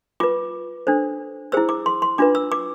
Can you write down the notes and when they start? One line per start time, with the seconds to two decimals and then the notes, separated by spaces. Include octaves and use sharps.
0.20 F4 B4 D6
0.87 D4 A4 C5
1.52 E4 G#4 C5 E6
1.69 D6
1.86 C6
2.02 C6
2.18 D4 F4 B4 D6
2.35 E6
2.52 D6